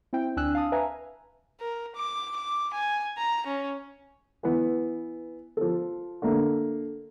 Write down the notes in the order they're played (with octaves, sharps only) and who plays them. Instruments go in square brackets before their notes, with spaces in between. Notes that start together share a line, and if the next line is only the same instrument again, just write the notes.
[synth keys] C4 E4 G5
D2 D4 G#5 E6 F#6
F5 A5 D#6
B4 E5 F5 G#5 A#5
[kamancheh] A#4
D6
D6
G#5
A#5
C#4
[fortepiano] E3 B3
F3 A4
D3 A3 A#3